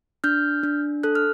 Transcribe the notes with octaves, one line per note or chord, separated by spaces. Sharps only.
D4 F6 G6
D4
A4 F#6
F6